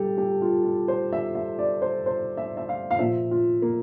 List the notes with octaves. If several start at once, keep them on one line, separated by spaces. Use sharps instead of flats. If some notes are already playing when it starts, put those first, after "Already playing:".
Already playing: G3 G4 A4
G4
F4
F4
C5
E5
E5
D5
C5
C5
E5
E5
F5
F5
A#2 F3 E5
F4
A#3